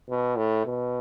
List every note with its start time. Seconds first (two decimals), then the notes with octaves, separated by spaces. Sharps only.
0.09 B2
0.37 A2
0.66 B2